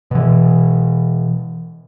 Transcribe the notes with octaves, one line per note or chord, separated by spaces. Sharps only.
B2 E3